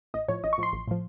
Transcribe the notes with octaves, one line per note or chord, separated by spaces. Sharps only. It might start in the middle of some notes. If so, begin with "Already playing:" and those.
A1 D#5
A2 F3 C#5
A1 D#5
C#6
A2 F3 C6
A1
A2 F3